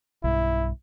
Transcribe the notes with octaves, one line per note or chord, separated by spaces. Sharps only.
B1 G2 E4